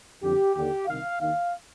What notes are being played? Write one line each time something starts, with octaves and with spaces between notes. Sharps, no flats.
G1 F2 D3 G4
D#2 D3 G4
C2 C3 D#3 F5
D#2 D#3 F5